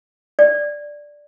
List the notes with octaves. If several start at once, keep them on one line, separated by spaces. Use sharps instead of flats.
D5